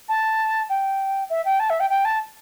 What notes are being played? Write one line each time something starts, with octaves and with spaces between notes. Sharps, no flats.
A5
G5
E5
G5
A5
E5
G5
G5
A5